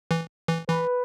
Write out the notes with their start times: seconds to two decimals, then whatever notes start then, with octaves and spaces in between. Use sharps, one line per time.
0.11 E3
0.48 E3
0.68 E3 B4